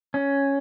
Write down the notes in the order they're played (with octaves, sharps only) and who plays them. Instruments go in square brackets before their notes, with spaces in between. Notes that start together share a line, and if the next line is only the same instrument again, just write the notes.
[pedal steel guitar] C#4